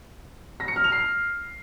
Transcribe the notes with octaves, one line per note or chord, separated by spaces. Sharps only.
A#6
C#7
F6
F7
C7